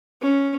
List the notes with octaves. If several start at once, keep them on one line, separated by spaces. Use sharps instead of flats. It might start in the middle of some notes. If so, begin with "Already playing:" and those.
C#4